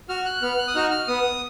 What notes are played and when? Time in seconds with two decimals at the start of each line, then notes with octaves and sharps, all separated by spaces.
0.09 F#4 F6
0.26 F#6
0.42 B3 F6
0.59 F#6
0.68 D#6
0.75 D#4 F#4 F6
0.91 F6
1.07 B3 D#6